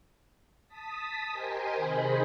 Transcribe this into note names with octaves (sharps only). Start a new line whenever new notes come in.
A5 D#6 B6
G4 A#4 C5 D#5 G#5
C3 D#3 G#4 C5 D#5 B5